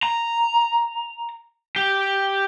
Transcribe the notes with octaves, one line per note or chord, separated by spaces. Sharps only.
A#5
G4